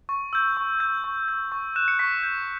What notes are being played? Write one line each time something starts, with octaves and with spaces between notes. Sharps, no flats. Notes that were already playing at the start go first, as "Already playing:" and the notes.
C#6
E6 G6
C#6
G6
C#6
G6
C#6
F#6 E7
C#7
C#6 B6
G6